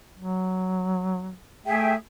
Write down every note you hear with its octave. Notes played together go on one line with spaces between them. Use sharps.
F#3
A3 G#4 E5 G5